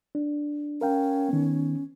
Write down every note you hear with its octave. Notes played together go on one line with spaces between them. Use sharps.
D4
C#4 A#4 F5 G5
D#3 B3